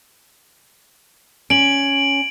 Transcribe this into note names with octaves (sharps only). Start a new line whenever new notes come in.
C#4 D7 F#7